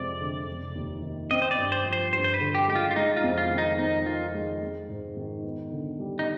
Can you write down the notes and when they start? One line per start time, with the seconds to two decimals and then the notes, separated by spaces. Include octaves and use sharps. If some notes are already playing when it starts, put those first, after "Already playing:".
Already playing: F2 C3 G#3 D5
0.21 D3
0.47 F1
0.75 D#2
1.03 D#3
1.31 C4 D#5
1.42 C5
1.51 D5
1.58 G2
1.72 C5
1.85 F3
1.93 C5
2.13 G2 C5
2.24 C5
2.34 B4
2.41 D3
2.55 G4
2.68 G#3 G4
2.75 F4
2.91 F4
2.96 G#3 D#4
3.17 F4
3.24 F2
3.38 F4
3.51 D#3
3.58 D#4
3.79 F2 D#4
4.06 D#3 F4
4.34 G#3
4.62 G#3
4.89 G#2
5.17 D#3
5.44 B3
5.72 D3
5.99 G3
6.19 D#4